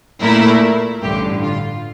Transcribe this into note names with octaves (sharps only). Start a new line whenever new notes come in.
A#2 A3 E4 A#4
A1 G2 D3 G4
F4